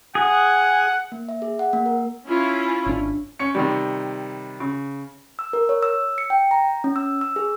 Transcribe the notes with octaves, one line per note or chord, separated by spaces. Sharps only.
G#4 F#5
A#3
E5
G#4
F#5
A#3
A#4
C#4 E4 F4
G#1 D4
C#4 C#7
C3 D#3 G3
C#3
E6
A#4
C#5
E6
C#7
G5
A#5
C#4
E6
E6
G#4